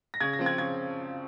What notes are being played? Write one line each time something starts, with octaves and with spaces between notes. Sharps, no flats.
A#6
C#3 G#6
A#6
F3 C4
G#6
C#3 G#6